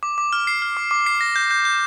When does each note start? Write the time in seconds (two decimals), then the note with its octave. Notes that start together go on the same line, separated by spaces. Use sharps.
0.03 D6
0.18 D6
0.33 F6
0.47 C7
0.62 F6
0.77 D6
0.91 D6
1.06 C7
1.21 A#6
1.36 G6
1.51 G6
1.65 G6